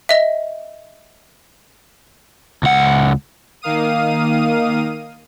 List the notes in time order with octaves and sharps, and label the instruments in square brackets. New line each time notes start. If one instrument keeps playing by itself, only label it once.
[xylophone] D#5 E5
[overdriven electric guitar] C#2 F#5
[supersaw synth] D#3 A#3 F5 D#6 D#7